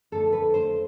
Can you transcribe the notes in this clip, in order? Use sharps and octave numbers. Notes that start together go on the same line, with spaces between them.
F2 D3 A3 A4
B4
C5